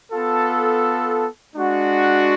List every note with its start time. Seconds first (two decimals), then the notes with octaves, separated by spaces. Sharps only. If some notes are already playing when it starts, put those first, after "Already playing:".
0.12 B3 F4 A4
1.55 G#3 D4 F#4